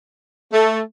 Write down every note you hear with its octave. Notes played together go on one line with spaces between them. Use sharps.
A3